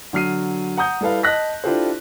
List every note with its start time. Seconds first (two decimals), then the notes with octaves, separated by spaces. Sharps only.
0.13 D3 F#3 F6 C7 D#7
0.77 F#5 A#5 D#6 G6
1.01 G3 E4 A4 B4 F5
1.23 D#5 A5 F#6 A#6 B6
1.64 D4 E4 F4 G4 A4 C5